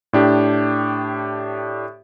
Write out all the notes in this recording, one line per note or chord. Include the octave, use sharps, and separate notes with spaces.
A2 D4 G4